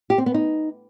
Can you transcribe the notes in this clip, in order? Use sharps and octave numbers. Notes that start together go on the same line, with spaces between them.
G4
C4
B3
D#4